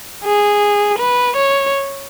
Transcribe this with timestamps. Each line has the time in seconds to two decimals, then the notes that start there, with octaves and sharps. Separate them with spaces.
0.24 G#4
0.99 B4
1.37 C#5